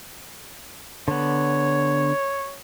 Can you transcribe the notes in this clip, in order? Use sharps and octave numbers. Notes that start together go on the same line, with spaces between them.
D3 B3 C#5